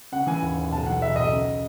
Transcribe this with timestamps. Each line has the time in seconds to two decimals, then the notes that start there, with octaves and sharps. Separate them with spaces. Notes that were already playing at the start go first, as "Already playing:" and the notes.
0.12 C#3 F#5
0.27 E3 G#5
0.42 D#2
0.58 D#2
0.71 B1 A5
0.86 E3 F#5
1.02 B1 E5
1.16 B1 D#5
1.31 C#3